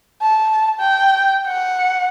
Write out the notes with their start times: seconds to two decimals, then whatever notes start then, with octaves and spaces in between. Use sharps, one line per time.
0.22 A5
0.80 G5
1.48 F#5